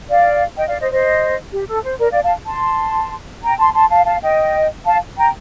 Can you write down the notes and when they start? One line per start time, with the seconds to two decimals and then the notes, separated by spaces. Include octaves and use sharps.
0.09 D5 F5
0.56 D#5 G5
0.68 D5 F5
0.80 C5 D#5
0.92 C5 D#5
1.52 G4
1.68 A4
1.84 C5
1.99 A#4 D5
2.11 D5 F5
2.24 F5 A5
2.47 A5 C6
3.42 G5 A#5
3.59 A5 C6
3.74 A5 C6
3.90 F5 A5
4.05 F5 A5
4.22 D#5 G5
4.85 F5 A5
5.17 G5 A#5